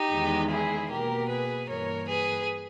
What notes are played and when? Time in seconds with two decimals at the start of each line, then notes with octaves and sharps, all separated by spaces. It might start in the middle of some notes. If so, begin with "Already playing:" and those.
Already playing: D#4 G4
0.11 E2 D#3 G#3
0.51 E4 G#4
0.90 B2 A#3 G4 A#4
1.29 G#4 B4
1.68 G2 E3 A#3 A#4 C#5
2.08 G#4 B4